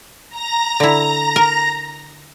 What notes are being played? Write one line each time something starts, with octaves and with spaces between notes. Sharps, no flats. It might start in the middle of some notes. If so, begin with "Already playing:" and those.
A#5 A#6
D3 E4
A#4